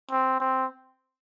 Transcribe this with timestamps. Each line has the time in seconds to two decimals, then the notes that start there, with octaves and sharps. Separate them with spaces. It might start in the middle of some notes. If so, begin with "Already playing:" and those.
0.11 C4
0.40 C4